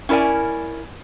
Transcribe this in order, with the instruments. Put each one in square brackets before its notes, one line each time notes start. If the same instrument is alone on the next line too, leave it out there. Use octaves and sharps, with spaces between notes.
[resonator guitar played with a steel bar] C#4 E4 A#4 D5 G#5